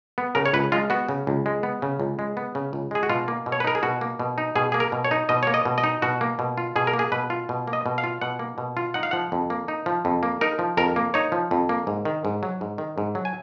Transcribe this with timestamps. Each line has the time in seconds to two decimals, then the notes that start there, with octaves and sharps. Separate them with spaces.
0.18 B3
0.35 C#3 A#4
0.46 C#5
0.53 C#2 B4
0.72 G#3 F4
0.90 B3 F#4
1.09 C#3
1.27 C#2
1.46 G#3
1.63 B3
1.82 C#3
2.00 C#2
2.19 G#3
2.37 B3
2.55 C#3
2.73 C#2
2.91 G#3 G#4
3.03 F#4
3.09 B2 F4
3.28 A#3
3.46 B2
3.52 C#5
3.60 B4
3.64 D#4 A#4
3.75 G#4
3.83 B2 F#4
4.01 A#3
4.19 B2
4.38 D#4
4.55 B2 G#4
4.72 A#3 G#4
4.80 A#4
4.92 B2
5.05 C#5
5.11 D#4
5.29 B2 D#5
5.43 A#3 C#5
5.54 D#5
5.65 B2
5.78 D#5
5.84 D#4
6.02 B2 F#4
6.21 A#3
6.39 B2
6.58 F4
6.76 B2 G#4
6.87 A#4
6.93 A#3
6.99 G#4
7.12 B2 B4
7.30 F4
7.49 B2
7.68 A#3
7.73 D#5
7.86 B2
7.98 F5
8.04 F4
8.21 B2 F#5
8.39 A#3
8.58 B2
8.77 F4
8.94 D#4 F#5
9.03 F5
9.11 F3 F#5
9.32 F2
9.50 A#3
9.68 D#4
9.86 F3
10.05 F2
10.23 A#3
10.41 D#4 A#4
10.59 F3
10.77 F2 A#4
10.96 A#3
11.14 D#4 C#5
11.32 F3
11.51 F2
11.69 A#3
11.87 G#2
12.05 D#3
12.25 G#2
12.43 F#3
12.61 G#2
12.78 D#3
12.98 G#2
13.15 F#3
13.25 G#5